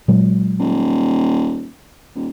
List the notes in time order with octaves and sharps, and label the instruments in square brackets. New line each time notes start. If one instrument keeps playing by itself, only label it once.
[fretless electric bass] A#2 F#3 G#3
[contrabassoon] D#1
D#1